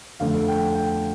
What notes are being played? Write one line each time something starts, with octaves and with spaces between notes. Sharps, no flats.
F2 D3 A3 F5
G5
G5